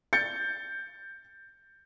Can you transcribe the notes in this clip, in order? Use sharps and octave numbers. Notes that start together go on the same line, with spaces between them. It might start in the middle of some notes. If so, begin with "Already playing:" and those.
G6 A6 C#7